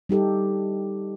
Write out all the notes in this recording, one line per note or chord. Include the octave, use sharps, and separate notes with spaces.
G3 D#4 G4 A4